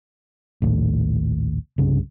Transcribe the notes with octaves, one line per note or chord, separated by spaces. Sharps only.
A#1 D#2 A2
C2 G2 C#3